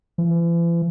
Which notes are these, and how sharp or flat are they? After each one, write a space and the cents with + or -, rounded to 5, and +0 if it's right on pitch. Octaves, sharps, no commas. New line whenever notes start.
E3 +45